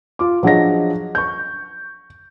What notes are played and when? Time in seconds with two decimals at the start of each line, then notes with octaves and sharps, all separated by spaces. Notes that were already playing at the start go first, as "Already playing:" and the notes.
0.19 F4 D6
0.43 F3 F#3 D4 G#4 D#5 A#6
1.15 C#6 G6